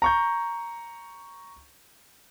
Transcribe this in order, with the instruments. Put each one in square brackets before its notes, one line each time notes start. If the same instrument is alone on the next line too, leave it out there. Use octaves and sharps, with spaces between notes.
[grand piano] A#5 C#6 G6